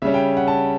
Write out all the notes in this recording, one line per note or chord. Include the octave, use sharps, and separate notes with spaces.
C#3 G3 C#4 E5
G5
F#5
A5